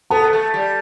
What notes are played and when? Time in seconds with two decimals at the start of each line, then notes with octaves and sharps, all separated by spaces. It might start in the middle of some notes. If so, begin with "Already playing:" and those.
0.10 B3 A4 A5
0.33 A3
0.54 G3